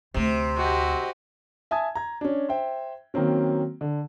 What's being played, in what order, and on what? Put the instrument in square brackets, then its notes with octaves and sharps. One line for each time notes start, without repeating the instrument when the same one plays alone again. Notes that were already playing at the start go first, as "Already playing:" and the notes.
[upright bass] D2 A3 [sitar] C3
[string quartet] F#4 G4 D#5
[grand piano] E5 G#5 A5 D#6 G#6
A#5 G#6
C#4 D4
C5 E5 G5
D#3 F#3 A#3 C4 C#4
D3